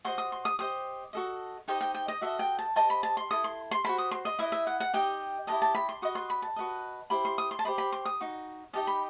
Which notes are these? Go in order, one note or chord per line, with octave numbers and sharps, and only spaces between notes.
F#4 C5 D#5 C6
D#6
C6
D#6
G4 C5 D#5 D#6
F#4 A4 D#5
D#4 G4 C5 D#5 G5
G5
G5
D#5
F#4 A4 D#5 E5
G5
A5
G4 C5 D#5 A5
B5
A5
C6
E4 A4 D#6
C6
C6
F#4 A4 C5 B5
D#6
C6
D#5
E4 B4 D#5 E5
E5
F#5
F#5
D#4 G4 D#5 G5
E4 G4 B4 D#5 A5
A5
B5
C6
F#4 B4 D#5 D#6
C6
B5
A5
F#4 B4 D#5
E4 G4 C5 B5
C6
D#6
C6
A5
G4 C5 D#5 B5
B5
C6
D#6
D#4 F#4
D#4 G4 D#5 A5
B5